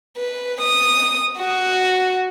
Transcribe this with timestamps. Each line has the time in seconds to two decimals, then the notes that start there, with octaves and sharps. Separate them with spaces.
0.17 B4
0.61 D#6
1.39 F#4